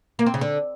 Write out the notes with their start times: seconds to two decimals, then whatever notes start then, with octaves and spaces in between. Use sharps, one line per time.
0.19 A#3
0.26 C4
0.34 C#3
0.41 D3